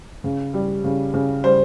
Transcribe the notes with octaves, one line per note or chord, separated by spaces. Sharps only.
C#3
G3
C#3
C#3
G3 C5